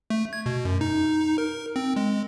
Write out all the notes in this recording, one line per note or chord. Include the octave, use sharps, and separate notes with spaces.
A3
G#6
B2
F#2
D#4
A#4
C4
G#3